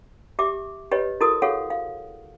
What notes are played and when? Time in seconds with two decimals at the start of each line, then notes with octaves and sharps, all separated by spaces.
0.39 G4 E5 D6
0.91 G4 B4 C#5 D#5
1.21 E4 F#4 A4 A#4 D#6
1.42 F#4 G#4 A4 C#5 F5 F#5
1.70 F5